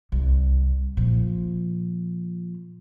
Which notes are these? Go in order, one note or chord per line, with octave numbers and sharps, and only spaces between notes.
C2
A#2 F3